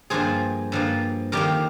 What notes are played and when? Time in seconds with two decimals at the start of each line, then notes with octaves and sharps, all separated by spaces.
0.10 G2 F3 A#3 G#4 C5
0.72 G2 F3 A#3
1.32 F2 D#3 A#3 G4 A#4